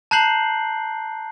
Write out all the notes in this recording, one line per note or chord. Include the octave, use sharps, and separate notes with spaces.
A5 A#5 F#6 G6 C7 F#7